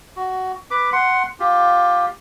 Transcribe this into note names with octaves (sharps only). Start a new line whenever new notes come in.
F#4
B4 D6
F#5 C6
F4 G4